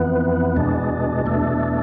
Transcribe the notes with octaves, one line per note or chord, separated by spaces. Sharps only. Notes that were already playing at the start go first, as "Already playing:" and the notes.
Already playing: F2 E3 B3
E2 B2 G#3 D4
E2 B2 A3 D4